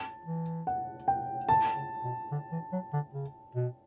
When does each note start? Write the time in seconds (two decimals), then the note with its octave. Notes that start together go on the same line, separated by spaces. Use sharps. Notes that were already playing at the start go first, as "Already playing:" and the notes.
Already playing: A5
0.25 E3
0.67 F#5
1.08 G5
1.49 D3 A5
1.76 C#3
2.04 B2
2.32 D3
2.52 E3
2.72 F#3
2.93 D3
3.14 C#3
3.55 B2